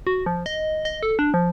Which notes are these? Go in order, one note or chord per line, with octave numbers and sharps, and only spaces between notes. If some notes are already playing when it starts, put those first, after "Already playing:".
F#4
F3
D#5
D#5
A4
D4
F3